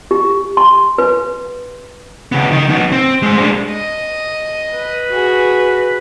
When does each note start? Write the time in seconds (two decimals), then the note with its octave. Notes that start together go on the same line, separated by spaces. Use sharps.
0.11 G4
0.57 C6
0.98 B4
2.32 C#3 B3
2.51 D#3 D#4
2.69 B3 D#4
2.92 C4
3.23 G#3 C5
3.38 G#3 D4
3.71 D#5
4.73 B4
5.09 F#4 G#4